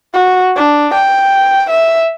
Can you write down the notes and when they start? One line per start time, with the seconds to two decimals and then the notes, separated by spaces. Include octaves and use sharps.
0.14 F#4
0.56 D4
0.94 G5
1.70 E5